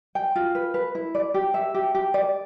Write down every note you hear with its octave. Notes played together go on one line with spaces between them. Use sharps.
G5
F4
B4
B4
E4
D5
G4
E5
G4
G4
D5